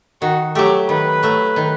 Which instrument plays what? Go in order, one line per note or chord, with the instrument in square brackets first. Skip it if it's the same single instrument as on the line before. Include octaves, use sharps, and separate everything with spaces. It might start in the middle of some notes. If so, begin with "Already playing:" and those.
[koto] D#3 [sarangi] F#4
[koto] F#3 A3 [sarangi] G4
[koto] D#3 [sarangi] B4
[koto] F#3 A3
D#3